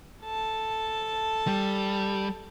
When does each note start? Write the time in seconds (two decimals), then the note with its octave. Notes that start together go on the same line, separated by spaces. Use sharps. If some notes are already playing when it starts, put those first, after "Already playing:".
0.23 A4 A5
1.47 G3